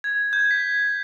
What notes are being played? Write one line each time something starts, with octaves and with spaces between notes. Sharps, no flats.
G#6
G6
B6